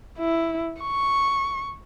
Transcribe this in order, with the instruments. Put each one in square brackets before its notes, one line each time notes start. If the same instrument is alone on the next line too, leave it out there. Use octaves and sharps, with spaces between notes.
[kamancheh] E4
C#6